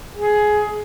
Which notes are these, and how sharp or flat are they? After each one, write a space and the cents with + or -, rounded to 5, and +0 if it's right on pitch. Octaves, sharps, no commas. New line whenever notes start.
G#4 +15